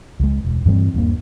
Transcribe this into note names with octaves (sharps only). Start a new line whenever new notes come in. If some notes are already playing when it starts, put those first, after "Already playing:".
C#2 G#3
E1
G2 E3 G3 C4
D#1 G2 A#3